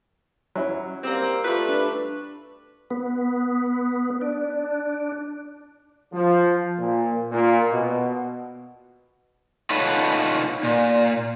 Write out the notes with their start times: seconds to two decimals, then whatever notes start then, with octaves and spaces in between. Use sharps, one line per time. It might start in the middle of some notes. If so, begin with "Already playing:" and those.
0.56 F#3 C#4 E4
1.03 G3 A#3 C4
1.45 G3 A3 F4 B4
1.69 D4
2.90 B3
4.21 D4
6.12 F3
6.78 A#2
7.32 A#2
7.71 B2
9.70 D#4 F4 A4 B4 C#5 F#5
10.63 A#2